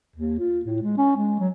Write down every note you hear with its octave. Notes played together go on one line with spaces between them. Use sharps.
D#2
F4
A2
G#3
C#4
G#3
F#3